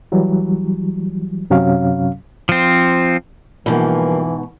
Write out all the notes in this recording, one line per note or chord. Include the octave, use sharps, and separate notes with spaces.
E3 F#3 G3
F#2 C3 F#3 C#4 F5
F3 C4
G#2 B2 E3 F3 G3 A#3